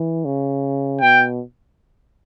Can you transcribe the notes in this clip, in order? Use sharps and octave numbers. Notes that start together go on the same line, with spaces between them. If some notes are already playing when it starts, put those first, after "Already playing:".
Already playing: E3
C#3
B2 G5